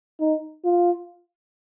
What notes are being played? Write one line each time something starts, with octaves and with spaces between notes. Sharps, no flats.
D#4
F4